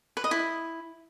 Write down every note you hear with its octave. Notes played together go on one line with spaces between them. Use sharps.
B4
D#5
E4